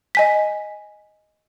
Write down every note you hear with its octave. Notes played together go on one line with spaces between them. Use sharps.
D#5 G#5 B6